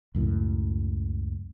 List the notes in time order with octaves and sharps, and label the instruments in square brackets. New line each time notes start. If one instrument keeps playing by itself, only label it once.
[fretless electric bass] C#2 F#2 A2